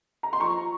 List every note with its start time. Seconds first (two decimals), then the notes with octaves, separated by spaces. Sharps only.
0.23 A#5
0.33 C6
0.40 F3 A#5 C#6